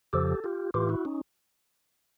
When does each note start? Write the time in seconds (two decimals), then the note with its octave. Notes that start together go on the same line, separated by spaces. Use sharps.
0.13 F2 C#3 F3 G4 A4
0.44 F4 G4
0.74 A2 E3 F4 G4
0.89 E4 F#4
1.05 C#4 D#4